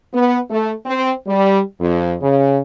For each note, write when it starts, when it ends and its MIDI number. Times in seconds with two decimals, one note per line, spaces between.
0.14 0.37 59
0.50 0.72 57
0.85 1.12 60
1.27 1.60 55
1.80 2.15 41
2.21 2.59 49